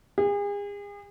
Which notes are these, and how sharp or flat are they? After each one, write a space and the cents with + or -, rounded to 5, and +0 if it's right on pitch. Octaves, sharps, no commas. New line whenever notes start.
G#4 -40